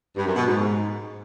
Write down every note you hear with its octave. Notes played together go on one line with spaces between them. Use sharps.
G2
F#2
B2
G#2